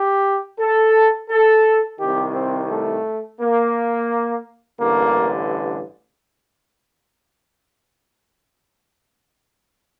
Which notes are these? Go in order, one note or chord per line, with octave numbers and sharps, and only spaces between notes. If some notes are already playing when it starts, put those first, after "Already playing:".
Already playing: G4
A4
A4
C2 C3 D#3 G4
C4
A3
A#3
A1 G2 D3 A#3